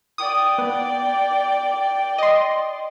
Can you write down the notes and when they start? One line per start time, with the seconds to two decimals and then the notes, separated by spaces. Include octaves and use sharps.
0.18 D5 G5 D#6
0.58 B3
2.18 D#5 C6